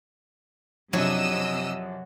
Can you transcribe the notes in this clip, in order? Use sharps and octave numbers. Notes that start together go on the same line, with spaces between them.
F#2 C3 F3 F#3 D4 D#5 E6